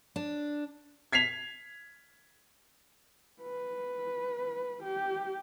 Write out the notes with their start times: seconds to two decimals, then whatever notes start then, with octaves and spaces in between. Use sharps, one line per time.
0.16 D4
1.12 G#6 B6 C7 F7
3.41 B4
4.83 G4